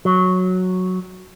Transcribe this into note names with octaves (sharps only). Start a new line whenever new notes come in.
F#3